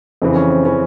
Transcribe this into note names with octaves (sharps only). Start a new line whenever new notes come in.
F2 C#3 E3 C4
C#4
C4
C#3 E3 C#4